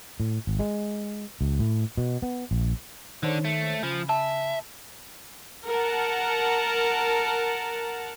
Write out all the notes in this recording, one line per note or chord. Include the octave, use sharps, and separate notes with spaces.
A2
G#1
G#3
C#2
A2
B2
B3
A#1
D3 D#3 D4 C5 C#5
A3
C#3 F3 G#5 B5
E5 A5
A#4 F#5 A5